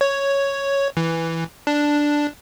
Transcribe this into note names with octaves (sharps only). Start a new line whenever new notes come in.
C#5
E3
D4